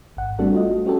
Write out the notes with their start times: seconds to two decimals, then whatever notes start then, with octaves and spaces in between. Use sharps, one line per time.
0.17 G#1 F#5
0.39 G3 A3 C4 D4 F#4 A4
0.54 F4 F#4 D#5
0.86 C#4 F#4 G4 A4